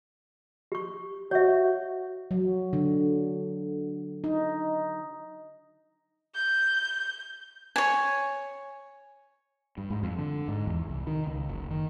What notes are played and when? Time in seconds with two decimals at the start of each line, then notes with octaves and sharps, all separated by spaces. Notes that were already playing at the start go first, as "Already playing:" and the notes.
0.72 G4 C#6
1.31 F#4 C#5 E5
2.31 F#3
2.73 D3
4.24 D#4
6.35 G6
7.76 C#5 G#5
9.78 G2
9.90 G#2
10.03 F2
10.19 D3
10.48 G#2
10.67 E2
10.89 C2
11.07 D#3
11.27 C#2
11.49 F#1
11.71 D#3